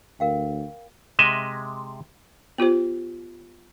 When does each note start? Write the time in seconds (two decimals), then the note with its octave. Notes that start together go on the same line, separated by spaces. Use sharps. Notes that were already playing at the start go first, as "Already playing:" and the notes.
0.20 D2 A#4 F5 G5
1.19 C3 G#3 D#5 E5
2.58 B3 F4 G4 C5